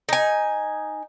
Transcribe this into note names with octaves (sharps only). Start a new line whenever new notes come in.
D#4 G#5